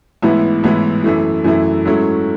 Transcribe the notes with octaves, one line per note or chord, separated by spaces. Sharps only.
A1 G#2 E3 B3 E4
A1 G#2 E3 B3 E4
F#2 E3 A3 E4
F#2 E3 A3 E4
G#2 F#3 A3 C#4 E4